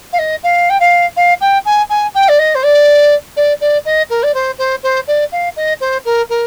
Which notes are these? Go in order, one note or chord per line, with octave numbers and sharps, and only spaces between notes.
F5
D#5
F5
G5
F5
F5
G5
G#5
G#5
G5
D5
D#5
C5
D5
D5
D5
D#5
A#4
D5
C5
C5
C5
D5
F5
D#5
C5
A#4
A#4